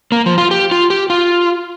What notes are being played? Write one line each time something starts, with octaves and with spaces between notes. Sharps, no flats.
A#3
F3
F4
G4
F4
G4
F4